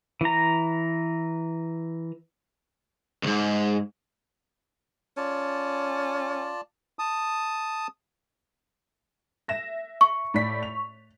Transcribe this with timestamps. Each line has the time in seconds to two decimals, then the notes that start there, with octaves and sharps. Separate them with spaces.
0.21 E3 A#5
3.23 C#2 G#2
5.17 C#4 F4 D5 A5
6.99 A5 D#6
9.48 E5 A#6 E7
10.01 C#6
10.34 A2 D5 B6
10.63 F7